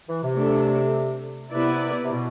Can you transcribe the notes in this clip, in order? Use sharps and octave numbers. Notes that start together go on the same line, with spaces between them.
E3
C3
A3 D4 A4
C3 B3 E4 B4 D5
C3
B2